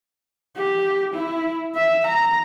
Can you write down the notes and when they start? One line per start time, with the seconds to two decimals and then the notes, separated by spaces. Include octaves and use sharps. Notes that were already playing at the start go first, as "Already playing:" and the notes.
0.56 G4
1.14 E4
1.75 E5
2.07 A#5